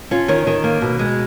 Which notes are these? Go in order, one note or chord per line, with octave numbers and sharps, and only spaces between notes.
C#4 F4
D#3 C#5
D#3
A#3
B2
G#3